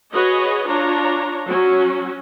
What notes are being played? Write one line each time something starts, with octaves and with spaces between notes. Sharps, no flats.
F#4 G#4 B4 C#5 D#5
D4 F4 C#5 A#5
F#3 C#4 F#4